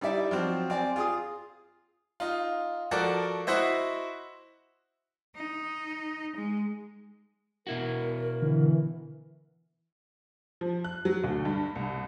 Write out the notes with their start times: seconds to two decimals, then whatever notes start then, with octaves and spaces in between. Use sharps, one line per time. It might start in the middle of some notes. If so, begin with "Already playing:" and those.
0.01 G3 D#4 E4 D5 E5
0.31 F3 F#3 C4
0.70 C4 D5 G#5
0.96 F4 G#4 D#6
2.20 D#4 F4
2.91 F3 F#4 A4 A#4 D5
3.47 E4 F#4 C5 D#5 E5
5.34 D#4
6.34 G#3
7.67 B2 E4 F#4 A#4
8.42 D3 E3
10.61 F3
10.84 F#6
11.05 F#3
11.24 D2
11.45 G2
11.76 C2